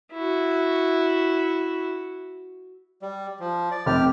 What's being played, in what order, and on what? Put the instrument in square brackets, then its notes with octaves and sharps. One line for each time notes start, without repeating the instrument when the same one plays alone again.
[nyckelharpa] E4 F#4
[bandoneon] G3
F3
D5
[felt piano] F1 [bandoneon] G4 F6